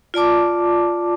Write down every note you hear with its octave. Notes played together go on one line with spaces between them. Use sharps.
F4 D5 A5 D6